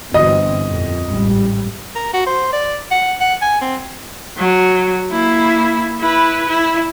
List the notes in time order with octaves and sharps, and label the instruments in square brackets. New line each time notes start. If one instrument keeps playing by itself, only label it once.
[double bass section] G1 E3 C4 [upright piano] D#5
[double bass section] F2 A#2
A1 G#2 G3
[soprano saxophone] A#4
F#4
C5
D5
F#5
F#5
G#5
C4
[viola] F#3
A#3 E4
E4 B4
E4